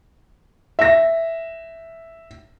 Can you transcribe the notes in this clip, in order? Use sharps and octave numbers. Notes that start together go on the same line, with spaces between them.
E5 A#6